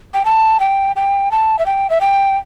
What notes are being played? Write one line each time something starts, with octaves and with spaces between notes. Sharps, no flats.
G5
A5
G5
G5
A5
E5
G5
E5
G5